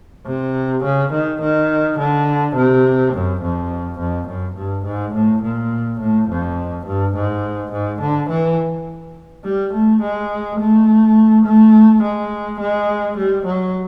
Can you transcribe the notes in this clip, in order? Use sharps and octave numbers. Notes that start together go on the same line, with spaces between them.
C3
C#3
D#3
D#3
D3
C3
F#2
F2
F2
F#2
G2
G#2
A2
A#2
A2
F2
G2
G#2
G#2
D3
E3
G3
A3
G#3
A3
A3
G#3
G#3
G3
F#3